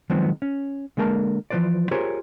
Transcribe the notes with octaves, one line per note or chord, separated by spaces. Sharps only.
D#3 F3 F#3 G#3 B3 C4
C#4
D3 G#3 A#3 A#4 A5
E3 F3 C#4 B4 C5 D5
F4 G4 G#4 A#4 C5 C#5